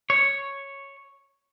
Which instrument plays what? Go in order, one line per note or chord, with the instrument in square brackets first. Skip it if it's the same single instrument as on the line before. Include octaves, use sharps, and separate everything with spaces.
[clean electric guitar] C#5